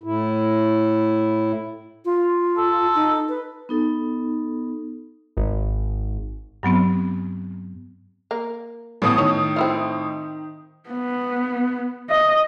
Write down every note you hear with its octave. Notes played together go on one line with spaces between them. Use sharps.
A2 E4
F4
A4
D#4
B4
B3 D#4 A4
G#1
G2 F#3 B3 C4
A#3
A1 A2 B3 A4 D#6
D#3 C#5
C4 E4 F4
B3
D#5